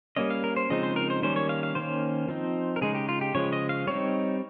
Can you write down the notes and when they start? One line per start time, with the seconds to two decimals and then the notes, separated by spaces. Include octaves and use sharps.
0.17 G3 A#3 C#4 D#5
0.30 F5
0.44 A#4
0.56 C5
0.70 C#3 F3 G#3 C4 D#4 D#5
0.83 C5
0.96 A#4
1.10 C5
1.23 D#3 G3 A#3 C#4 C5
1.36 C#5
1.49 F5
1.63 F5
1.75 D#3 A#3 C#4 C5
2.28 F3 C4 D#4
2.76 A#4
2.81 C#3 G#3 D#4 G#4
2.95 G4
3.09 F4
3.21 G4
3.34 C#3 F3 G#3 C#5
3.53 D#5
3.69 F5
3.87 G3 C4 D#4 C#5